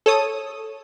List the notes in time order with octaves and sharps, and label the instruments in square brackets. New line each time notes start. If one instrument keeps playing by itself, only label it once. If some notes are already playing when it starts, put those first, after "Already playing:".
[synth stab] A4 C#5 D#6